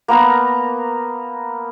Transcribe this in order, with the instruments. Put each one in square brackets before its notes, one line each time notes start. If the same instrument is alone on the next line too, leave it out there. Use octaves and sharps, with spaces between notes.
[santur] A#3 B3 A#4 A#5